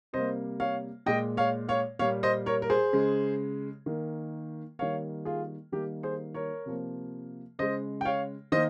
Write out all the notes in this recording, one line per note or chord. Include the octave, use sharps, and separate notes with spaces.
C3 G3 A#3 C5 D#5
C#5 F5
A#2 G#3 D#5 G5
C#5 F5
C#5 F5
A#2 G3 A#3 C#5 F5
C5 D#5
A#4 C#5
A#4
G#4 C5
C#3 G#3
D#3 A#3
D#3 G3 A#3 C#5 F5
F4 G#4
D#3 G3 A#3 G4 A#4
G#4 C5
A#4 C#5
C3 F3 A#3
C#3 G#3 C5 D#5
G5
C#5 F5
D#3 A#3 C5 D#5